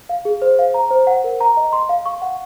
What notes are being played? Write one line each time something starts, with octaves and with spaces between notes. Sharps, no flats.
F5
G#4
C5
F5
A#5
C5
F#5
A#4
A#5
D#5
C6
F5
C#6
F#5